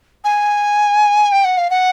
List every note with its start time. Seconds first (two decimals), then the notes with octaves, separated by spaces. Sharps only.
0.24 G#5
1.32 G5
1.44 F#5
1.57 F5
1.70 F#5